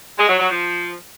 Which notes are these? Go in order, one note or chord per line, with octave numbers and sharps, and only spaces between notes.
G#3
F#3
F#3
F3